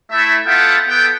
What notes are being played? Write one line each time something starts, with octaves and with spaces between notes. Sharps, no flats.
A3 E4 E5
B3 F4 A4 E5 F#5 G5
B3 A4 G5